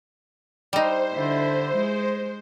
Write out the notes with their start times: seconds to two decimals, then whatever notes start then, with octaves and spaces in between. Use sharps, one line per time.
0.73 G3 D#4 C5
1.13 D3 E4
1.77 G#3